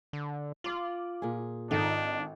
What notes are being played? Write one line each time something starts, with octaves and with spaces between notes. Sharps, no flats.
D3
F4 D6 F#7
A#2 G#4
G#1 D4 D#4 A4